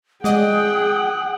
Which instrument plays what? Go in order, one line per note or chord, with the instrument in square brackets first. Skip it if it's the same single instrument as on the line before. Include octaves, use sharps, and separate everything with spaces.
[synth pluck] G#3 D5 D#5 [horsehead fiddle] G#4 G5 [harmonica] F#5 [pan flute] D#6